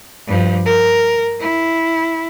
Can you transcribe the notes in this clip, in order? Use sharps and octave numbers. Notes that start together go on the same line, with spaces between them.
G2 F3
A#4
E4